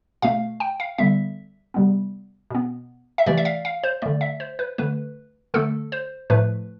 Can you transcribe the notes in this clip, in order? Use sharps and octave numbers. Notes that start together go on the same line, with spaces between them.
B2 A3 F5
G5
F5
D3 G3 B3 E5
C3 G3 B3
B2 B3
E5
C3 E3 A3 D5
E5
F5
F5
C5
D3 A3 D5
E5
C5
B4
D3 A3 B4
D3 A3 A4
C5
A2 F3 A3 B4